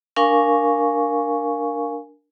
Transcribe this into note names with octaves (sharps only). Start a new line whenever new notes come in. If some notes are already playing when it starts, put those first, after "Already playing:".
D4 A#4 F5 G#5 C#6